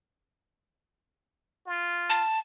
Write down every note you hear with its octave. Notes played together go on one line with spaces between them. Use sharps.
F4
A5